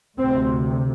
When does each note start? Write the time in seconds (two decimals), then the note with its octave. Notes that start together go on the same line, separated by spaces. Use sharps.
0.18 D2 C3 C4